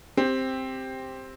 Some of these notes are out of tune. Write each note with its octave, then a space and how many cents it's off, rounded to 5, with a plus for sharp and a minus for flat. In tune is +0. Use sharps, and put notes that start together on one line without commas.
C4 +5 G4 +10